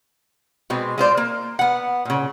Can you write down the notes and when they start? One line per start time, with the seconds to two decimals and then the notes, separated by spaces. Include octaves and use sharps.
0.70 B2 G#3 C4
0.98 G#3 F4 C5 D5
1.17 A#3
1.59 B3 F#5
2.05 A#2 C#3